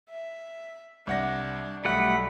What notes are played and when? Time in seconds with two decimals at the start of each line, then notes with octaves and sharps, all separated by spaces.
0.10 E5
1.07 C2 D4 F#5 A#6
1.85 B1 G3 A3 F#5 B5